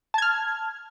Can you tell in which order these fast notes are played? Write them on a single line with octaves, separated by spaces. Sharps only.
A5 G#6 F6